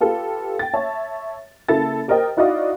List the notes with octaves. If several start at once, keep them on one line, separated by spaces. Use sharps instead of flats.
F4 G4 A4 B4
G5 A6
C#5 E5 A5
C#3 A#3 E4 A4 A5 A6
G4 A#4 C5 D#5 G5
D#4 E4 F#4 D5 D#5 F5